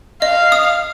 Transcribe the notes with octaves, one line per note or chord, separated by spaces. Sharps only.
D#5 F5
D#6